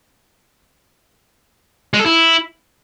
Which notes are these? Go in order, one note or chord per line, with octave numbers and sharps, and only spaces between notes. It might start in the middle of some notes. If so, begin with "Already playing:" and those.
G#3
A4
E4